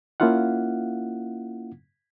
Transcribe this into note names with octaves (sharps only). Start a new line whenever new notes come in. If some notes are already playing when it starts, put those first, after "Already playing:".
A#3 C#4 E4 F4 F5 F#5